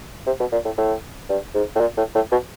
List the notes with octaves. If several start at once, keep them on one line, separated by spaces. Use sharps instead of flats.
C3
B2
A#2
A2
A2
G2
G#2
A2
A#2
A2
A2
B2